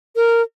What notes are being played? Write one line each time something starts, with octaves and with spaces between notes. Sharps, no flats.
A#4